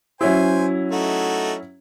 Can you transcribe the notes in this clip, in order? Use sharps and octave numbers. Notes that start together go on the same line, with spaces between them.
F#3 C#4 E4 C5 G#5
A3 D#4 F#4